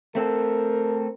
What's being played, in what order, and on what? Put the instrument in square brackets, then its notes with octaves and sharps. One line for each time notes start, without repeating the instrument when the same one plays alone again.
[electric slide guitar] A3 C4 A4 [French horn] A#4